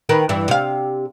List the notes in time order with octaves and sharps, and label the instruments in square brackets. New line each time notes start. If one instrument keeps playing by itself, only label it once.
[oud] D#3 A#4 B4
G2 E3
C3 F5